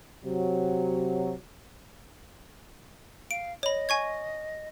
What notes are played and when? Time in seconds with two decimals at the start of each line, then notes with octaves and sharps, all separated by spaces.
0.24 C3 F#3
3.31 F5 D7
3.63 C#5 D#5 B5
3.89 G#5 C#6 G#6